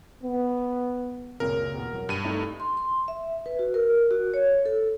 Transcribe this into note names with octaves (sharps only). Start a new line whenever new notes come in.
B3
C#2 F#2 A#2 A#4
E2 B2
F#3
G2 D#7
A3 D#4 F7
C6
C6
E5
B4
F#4
A#4
F#4
C#5
A4